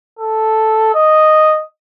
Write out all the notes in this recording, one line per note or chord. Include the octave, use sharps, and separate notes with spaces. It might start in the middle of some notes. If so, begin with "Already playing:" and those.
A4
D#5